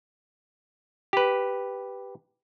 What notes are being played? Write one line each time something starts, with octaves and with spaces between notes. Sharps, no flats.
G4 B4